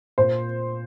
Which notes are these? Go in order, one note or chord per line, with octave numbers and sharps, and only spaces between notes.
A#2 C5